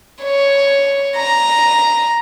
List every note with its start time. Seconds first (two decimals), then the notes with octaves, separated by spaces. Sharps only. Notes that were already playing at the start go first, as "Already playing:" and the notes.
0.24 C#5
1.17 A#5